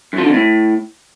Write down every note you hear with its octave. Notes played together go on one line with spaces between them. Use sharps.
F#2
F3
D3
F2
A2